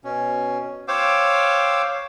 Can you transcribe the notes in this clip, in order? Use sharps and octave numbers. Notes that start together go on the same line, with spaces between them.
B2 C#4
C5 C#5 F5 G5 D6 E6